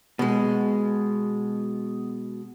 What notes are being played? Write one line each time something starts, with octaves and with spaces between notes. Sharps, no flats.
B2 G#3